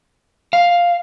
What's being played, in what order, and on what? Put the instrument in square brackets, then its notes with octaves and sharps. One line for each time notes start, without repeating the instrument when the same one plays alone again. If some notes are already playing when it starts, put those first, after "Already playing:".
[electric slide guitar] F5